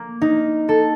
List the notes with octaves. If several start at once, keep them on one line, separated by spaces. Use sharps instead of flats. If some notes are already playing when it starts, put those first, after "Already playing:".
Already playing: A#3
D#4
A4